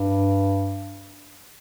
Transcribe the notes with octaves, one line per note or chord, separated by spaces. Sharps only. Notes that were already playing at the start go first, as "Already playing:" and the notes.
Already playing: G2